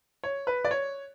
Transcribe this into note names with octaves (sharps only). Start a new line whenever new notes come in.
C#5
B4
D5
C#5